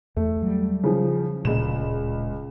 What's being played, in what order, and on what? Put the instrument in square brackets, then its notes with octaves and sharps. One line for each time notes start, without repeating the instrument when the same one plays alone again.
[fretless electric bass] E2 [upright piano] A3
[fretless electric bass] F#3 G3
[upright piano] C#3 F3
[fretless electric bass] D1 A#2 [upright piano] C#2 E7